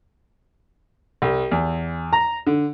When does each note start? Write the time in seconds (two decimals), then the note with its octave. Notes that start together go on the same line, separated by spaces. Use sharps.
1.22 C2
1.51 E2
2.13 A#5
2.47 D3